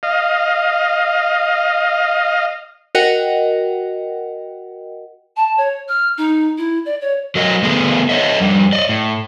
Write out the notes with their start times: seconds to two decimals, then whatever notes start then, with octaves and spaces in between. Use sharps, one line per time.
0.03 D#5 F5
2.95 F#4 A#4 D#5 F#5 G5
5.36 A5
5.57 C#5
5.88 F6
6.17 D#4
6.57 E4
6.85 D5
7.01 C#5
7.35 F#3 A#4 D#5
7.62 D3 A3 B3 G#4 A4 B4
8.09 A4 C5 C#5 D#5 E5
8.40 F2 G3
8.73 D5 D#5
8.89 A2